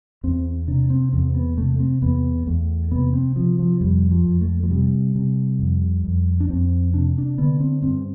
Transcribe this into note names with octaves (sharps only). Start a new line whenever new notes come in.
E2 C4
C3 D4
C4
E2 C4
B3
C3 A3
C4
E2 B3
E2 A3
C3 B3
C4
C3 F3
F3
F2 G3
F3
F2
A3
F3
C3 G3
C3
F2
F2
D4
F2 C4
C3 D4
D4
D3 B3
C4
G2 C4